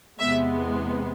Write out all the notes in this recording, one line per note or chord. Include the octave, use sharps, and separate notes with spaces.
E2 C3 G#3 B3 E5